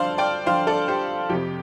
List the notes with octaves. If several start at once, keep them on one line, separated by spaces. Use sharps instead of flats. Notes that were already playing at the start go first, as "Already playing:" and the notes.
Already playing: G2 D3 F3 A4 C5 D5 F5
D5 G5
G2 D3 F3 C5 F5
A4 D5
G4 C5
F2 C3 F3 G4